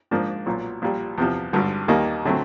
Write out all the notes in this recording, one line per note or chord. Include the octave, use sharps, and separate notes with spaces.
G#2 F3 A#3 D4
B1 A#2 F#3
A#1 A#2 G3
E2 C3 F3
G#1 G2 D3
D#2 D#3 G3 A#3 D#4
D3 F#3 A3 C4